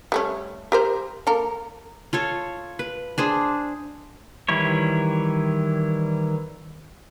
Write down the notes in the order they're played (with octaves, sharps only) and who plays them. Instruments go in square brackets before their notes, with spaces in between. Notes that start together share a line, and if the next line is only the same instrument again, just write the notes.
[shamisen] G3 A3 C#4
G4 A#4 C5
A#3 A4 A#4
[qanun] F4 A4 C#5
B4
D4 G#4 C5
[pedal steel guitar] D#3 E3 G3 E4 C#5